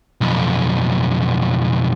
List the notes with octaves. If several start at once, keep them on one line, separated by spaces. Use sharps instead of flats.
B1 F2